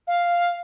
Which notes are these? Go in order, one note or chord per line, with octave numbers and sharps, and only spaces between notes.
F5